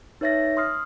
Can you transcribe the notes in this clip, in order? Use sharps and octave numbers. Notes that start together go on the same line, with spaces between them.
D#4 B4 C#5 E5 A6 A#6
C6 D#6 F6 C7